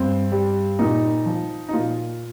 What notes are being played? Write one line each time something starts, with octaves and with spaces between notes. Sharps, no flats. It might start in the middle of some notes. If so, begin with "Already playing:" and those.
Already playing: G2 C4
G3
A#2 D#4
F3
D#4
A#2 F4